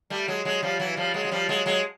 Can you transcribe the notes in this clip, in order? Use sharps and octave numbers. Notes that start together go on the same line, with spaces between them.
G3 A3
F#3 G#3
F#3 G#3
F3 G3
E3 F#3
F3 G3
F#3 G#3
F#3
F3 G3
F#3 G#3
F#3 G#3